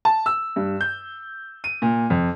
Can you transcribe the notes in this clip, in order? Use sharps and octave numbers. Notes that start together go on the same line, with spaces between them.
A5
E6
G2
G6
D#7
A#2
F2